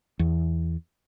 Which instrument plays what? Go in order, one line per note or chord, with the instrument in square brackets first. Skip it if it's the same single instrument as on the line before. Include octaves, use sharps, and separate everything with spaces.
[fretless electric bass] E2